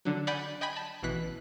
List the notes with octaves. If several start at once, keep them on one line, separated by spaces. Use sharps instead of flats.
D3 F#3
D5 F#5 G#5 B5 G6 C#7
D#5 G5 G#5 B5
A5
A1 B2 E3 F#6 B6